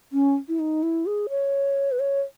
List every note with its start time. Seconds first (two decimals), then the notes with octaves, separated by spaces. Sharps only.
0.13 C#4
0.49 E4
0.60 D#4
0.83 E4
1.06 G#4
1.29 C#5
1.92 B4
2.00 C#5